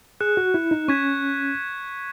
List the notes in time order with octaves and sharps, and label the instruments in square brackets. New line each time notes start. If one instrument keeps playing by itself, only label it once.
[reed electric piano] G#4 [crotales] F#6 C#7 E7
[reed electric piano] F#4
E4
D#4
[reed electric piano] C#4 [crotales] C#6 G#6 B6 E7